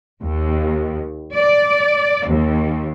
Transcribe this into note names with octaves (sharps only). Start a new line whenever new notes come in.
D#2
D5
D#2